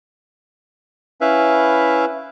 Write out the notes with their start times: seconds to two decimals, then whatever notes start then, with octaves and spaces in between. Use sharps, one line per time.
1.21 C#4 E4 B4 E5 F5